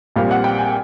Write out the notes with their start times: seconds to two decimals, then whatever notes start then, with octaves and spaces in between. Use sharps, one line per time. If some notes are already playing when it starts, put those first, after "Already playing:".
0.16 A#1 A#2 G3 C4 F5
0.31 F#5
0.44 G5
0.58 G#5